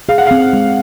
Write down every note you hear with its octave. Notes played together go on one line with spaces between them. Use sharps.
G#4 F5
F#5
C4 F5
G#3